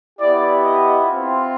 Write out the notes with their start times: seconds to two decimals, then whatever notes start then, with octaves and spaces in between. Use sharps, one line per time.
0.19 B3 E4 G4 D5
0.63 D#5
1.06 C4 F4